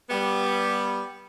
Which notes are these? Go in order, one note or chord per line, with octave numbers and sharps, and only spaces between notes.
G3 B3